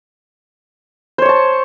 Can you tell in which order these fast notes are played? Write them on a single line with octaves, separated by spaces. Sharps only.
C5 C#5 C#6 A5